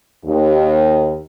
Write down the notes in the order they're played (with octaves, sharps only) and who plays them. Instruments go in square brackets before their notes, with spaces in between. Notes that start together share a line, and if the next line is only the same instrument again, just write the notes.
[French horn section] D#2